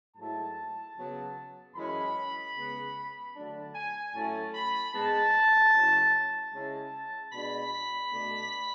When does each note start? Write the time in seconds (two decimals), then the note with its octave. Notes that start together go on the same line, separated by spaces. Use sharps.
0.16 G#2 F#3 A3 E4 A5
0.96 C#3 F#3 B3
1.75 F#2 E3 G#3 C#4 B5
2.55 C#3 G#3 B3
3.34 D3 F#3 A3 D4 A5
3.75 G#5
4.14 A2 F#3 A3 C#4 A5
4.55 B5
4.93 G#2 G#3 B3 A5
5.74 C#3 F#3 C#4 E4
6.53 C#3 G#3 C#4 E4 A5
7.32 B2 G#3 D4 B5
8.13 B2 A3 D4